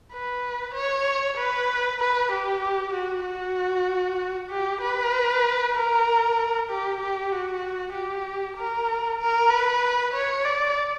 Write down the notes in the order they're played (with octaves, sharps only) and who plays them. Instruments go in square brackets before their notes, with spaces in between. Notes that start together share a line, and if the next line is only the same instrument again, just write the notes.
[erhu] B4
C#5
B4
B4
G4
F#4
F#4
G4
B4
A#4
G4
G4
F#4
G4
A#4
A#4
B4
C#5
D5